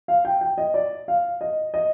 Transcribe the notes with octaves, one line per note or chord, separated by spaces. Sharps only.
F5
G5
G5
D#5
D5
F5
D#5
D#5